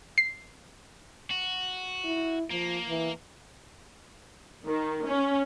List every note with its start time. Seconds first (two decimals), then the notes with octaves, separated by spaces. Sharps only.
0.18 C7
1.31 F#4
2.05 E4
2.51 F3 A#3
2.88 E3
4.65 D#3
5.06 C#4